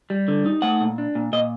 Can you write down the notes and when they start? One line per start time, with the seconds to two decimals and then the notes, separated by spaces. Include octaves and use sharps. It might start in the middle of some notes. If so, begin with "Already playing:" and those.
0.10 G3
0.28 D3
0.46 D#4
0.62 A3 F#5
0.81 A#2
0.98 D4
1.15 A#2
1.33 A#2 D#5